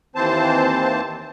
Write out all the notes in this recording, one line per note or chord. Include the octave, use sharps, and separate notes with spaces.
D#2 E3 C4 C5 A5